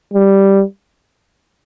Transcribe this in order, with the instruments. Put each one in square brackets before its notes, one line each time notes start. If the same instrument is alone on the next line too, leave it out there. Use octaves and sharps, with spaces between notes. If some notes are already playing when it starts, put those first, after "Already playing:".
[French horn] G3